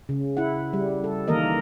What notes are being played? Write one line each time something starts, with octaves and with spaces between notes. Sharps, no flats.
C#3
E4 F#5
G3
A4
D#3 E3 A#3 A#4 D#5